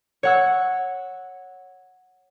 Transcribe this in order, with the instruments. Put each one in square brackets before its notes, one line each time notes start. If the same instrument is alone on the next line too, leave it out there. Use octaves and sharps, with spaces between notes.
[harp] C#5 F#5 E6